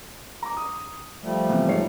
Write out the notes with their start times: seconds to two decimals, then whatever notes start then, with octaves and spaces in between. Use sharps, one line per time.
0.42 A#5 D6
0.57 D#6
1.23 F3 G3 A3
1.50 C3 E3 B3
1.68 G#2 C#5 C7